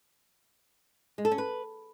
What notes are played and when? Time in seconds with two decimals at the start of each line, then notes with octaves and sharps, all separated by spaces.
1.18 G#3
1.25 A4
1.31 C#4
1.38 B4